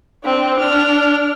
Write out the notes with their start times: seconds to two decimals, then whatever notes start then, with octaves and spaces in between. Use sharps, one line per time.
0.24 C4 D4
0.60 D4 F6